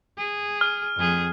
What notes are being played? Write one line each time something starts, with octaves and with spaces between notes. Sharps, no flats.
G#4
F6
F2 G#4